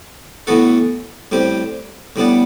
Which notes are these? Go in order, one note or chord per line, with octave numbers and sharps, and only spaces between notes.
A2 E3 B3 F#4 A4
A2 G3 C4 G4
A2 G3 B3 D4